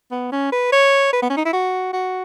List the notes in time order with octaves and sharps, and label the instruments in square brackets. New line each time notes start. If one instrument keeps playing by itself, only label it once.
[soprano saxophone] B3
C#4
B4
C#5
B4
B3
C#4
D#4
E4
F#4
F#4